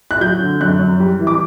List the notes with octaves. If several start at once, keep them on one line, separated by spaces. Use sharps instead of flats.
F#6
F#3 G6
D3
F#2 F#6
F#2
G3
E3
D6